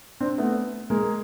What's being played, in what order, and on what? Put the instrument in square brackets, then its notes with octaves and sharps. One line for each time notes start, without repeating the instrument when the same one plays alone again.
[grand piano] C4 D4
A3 B3
G#3 A#3